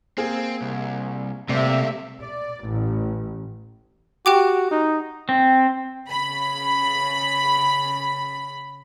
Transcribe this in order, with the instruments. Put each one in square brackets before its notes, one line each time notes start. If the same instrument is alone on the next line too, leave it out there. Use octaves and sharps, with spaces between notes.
[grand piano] A#3 G#4 A#4 [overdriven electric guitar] C4
[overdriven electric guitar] C2
[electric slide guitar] C3 [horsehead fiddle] G3 E5 [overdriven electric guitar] A3 A#3 [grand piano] D5 C7
[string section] D5
A1
[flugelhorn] F#4 [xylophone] G4 G5 D6
[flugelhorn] D#4
[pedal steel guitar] C4
[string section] C#3 B5